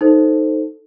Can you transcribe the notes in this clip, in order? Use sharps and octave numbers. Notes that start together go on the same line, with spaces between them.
D#4 A4 C5